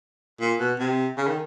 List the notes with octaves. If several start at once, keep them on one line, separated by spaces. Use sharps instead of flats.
A#2
B2
C3
C#3
D#3